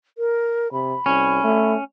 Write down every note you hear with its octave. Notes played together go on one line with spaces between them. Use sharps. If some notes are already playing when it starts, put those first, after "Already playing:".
A#4
C3 B5
C2 C#4
A3